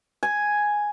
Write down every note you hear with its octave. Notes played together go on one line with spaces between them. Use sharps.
G#5